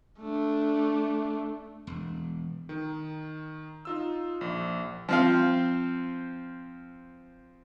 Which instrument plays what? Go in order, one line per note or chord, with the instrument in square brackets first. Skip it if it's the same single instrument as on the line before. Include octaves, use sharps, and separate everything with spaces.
[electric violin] A3 D4
[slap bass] E1
[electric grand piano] D#3
D#4 F4 E6
A#1
[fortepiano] F3 C4 F5